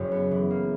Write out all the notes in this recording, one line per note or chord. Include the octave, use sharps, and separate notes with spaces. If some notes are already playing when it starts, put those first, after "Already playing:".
Already playing: F#1 F#2 F#3 C#4
B3
E3
A#3